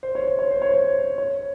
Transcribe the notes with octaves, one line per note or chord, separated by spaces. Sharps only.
C5
C#5
C5
C#5
C5
C#5
C5
C#5